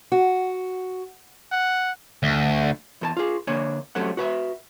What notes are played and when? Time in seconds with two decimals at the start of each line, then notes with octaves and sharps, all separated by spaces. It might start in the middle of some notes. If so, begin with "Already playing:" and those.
0.12 F#4
1.52 F#5
2.23 D2
3.01 E2 A4 A5
3.17 F4 G#4
3.47 D3 A#3 D4 C#5 G#5
3.95 C2 C3 F#3 A3 C#4 F#5
4.17 F#4 B4 E5